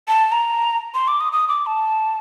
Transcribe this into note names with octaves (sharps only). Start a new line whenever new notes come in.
A5
A#5
C6
D6
D#6
D#6
D6
A5